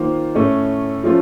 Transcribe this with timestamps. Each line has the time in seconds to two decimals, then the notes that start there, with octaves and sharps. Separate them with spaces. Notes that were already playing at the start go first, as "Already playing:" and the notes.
Already playing: D#3 A#3 F4 C5
0.35 A2 A3 C#4
1.04 F3 A3 C#4 F4